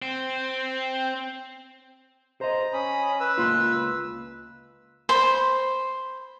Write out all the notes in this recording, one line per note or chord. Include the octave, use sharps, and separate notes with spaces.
C4
C5 D#5 A#5
C#4 B5 D#6
B4 E6
C#2 A#3 F4
C5 B5